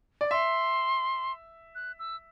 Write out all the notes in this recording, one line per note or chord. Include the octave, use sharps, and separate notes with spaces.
D5
E5 C6
F#6
E6